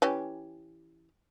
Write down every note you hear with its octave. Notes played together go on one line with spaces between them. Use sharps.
E3 C#4 G4